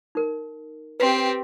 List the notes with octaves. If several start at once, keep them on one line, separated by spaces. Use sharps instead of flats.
D#4 A#4
C4 G4 B4